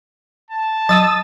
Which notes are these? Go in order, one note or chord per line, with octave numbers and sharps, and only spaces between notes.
A5
F#3 D#6 E6 A6